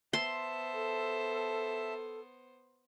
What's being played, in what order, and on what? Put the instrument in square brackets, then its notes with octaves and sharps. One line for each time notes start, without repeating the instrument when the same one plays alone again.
[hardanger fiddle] B3 C5 [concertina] E5 A5 [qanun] C6
[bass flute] A4